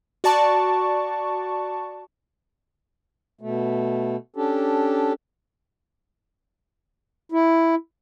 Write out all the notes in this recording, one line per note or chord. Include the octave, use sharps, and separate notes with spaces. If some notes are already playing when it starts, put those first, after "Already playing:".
F#4 D5 A5 C#6
B2 A3
C#4 D4 G4 A4
E4